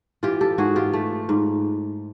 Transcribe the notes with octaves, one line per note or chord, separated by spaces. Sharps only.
E3 F4 G4
G4 A4
G#2 F#4 G#4
F4 G4
A3
G#2